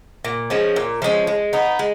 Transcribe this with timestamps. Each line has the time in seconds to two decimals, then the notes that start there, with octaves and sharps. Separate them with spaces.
0.25 A#2
0.50 F3 G#3 C#4
0.76 A#2
1.02 F3 G#3 C#4
1.27 G#3
1.53 B3 D#4
1.79 G#3